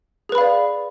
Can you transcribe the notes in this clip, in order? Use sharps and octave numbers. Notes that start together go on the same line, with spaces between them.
G#4 B4 D5 F5 B5